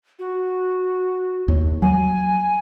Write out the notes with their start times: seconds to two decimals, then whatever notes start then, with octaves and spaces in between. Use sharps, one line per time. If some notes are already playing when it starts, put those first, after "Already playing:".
0.19 F#4
1.48 D#2
1.82 F#3 G#5